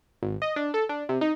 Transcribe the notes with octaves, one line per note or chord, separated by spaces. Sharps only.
G#1
D#5
D4
A4
D4
C3
D#4